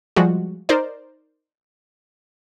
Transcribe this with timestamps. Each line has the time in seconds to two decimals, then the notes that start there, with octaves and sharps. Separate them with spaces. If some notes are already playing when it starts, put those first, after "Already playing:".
0.16 F3 G3 G#3 F#4
0.69 D#4 A#4 C5 D5